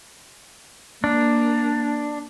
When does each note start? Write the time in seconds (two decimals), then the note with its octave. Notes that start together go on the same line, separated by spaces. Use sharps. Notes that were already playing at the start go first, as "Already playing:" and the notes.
1.04 A#3 D4